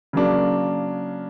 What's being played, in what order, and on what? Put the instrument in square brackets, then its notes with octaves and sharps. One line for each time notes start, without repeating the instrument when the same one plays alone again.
[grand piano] C#3 F#3 A#3 D4